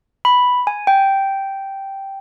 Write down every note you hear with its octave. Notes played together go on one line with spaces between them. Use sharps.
B5
G#5
G5